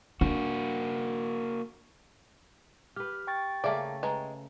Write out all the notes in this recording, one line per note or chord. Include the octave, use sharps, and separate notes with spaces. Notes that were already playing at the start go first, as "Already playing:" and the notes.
A#3 D4 F#4
G4 B4 F6
G5 C#6 A6
C#3 A3 A#3 D5 E5
G#3 B4 A#5